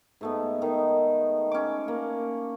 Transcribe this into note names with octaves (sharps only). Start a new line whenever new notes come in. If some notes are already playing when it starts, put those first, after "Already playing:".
G#2 A3 B3
D#3
C#4 D6
A#3